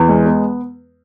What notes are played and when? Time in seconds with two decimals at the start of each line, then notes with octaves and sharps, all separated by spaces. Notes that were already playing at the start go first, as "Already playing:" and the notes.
Already playing: E2
0.09 G#3
0.26 B3